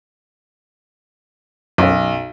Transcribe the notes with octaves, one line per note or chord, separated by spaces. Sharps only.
B1 F#2